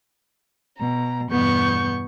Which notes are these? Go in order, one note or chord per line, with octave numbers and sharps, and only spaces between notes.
B2 A#5
E2 G2 B2 B3 C#6 G6